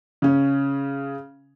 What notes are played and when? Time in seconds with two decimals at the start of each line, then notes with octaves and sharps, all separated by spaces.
0.22 C#3 C#4